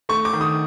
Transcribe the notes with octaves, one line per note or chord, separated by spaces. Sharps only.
A3 C#6
D6
D#3
D#6